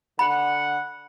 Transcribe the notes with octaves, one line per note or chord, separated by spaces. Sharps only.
D3 F#5 B5